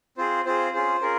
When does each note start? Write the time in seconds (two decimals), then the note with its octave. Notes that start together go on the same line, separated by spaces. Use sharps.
0.17 C4 F4 G#4 C5
0.45 C4 F4 G#4 C5
0.74 C#4 F4 G#4 C5
1.02 C#4 F4 G#4 A#4